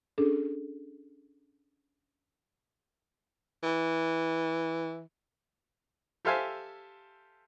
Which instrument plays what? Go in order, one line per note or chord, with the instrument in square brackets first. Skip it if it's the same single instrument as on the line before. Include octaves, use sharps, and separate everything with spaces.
[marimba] C#4 D4 G#4 A4
[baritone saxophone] E3
[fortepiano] G4 A4 C5 E5 F5 G#5